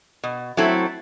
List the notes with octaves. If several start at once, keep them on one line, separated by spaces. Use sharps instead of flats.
B2
F#3 A3 C4 E4